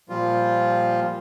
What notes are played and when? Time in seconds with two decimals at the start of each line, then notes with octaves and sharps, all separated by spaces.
0.09 A#2 F3 G3 F4